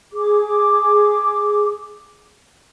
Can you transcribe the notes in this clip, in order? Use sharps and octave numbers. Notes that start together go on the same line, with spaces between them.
G#4 D6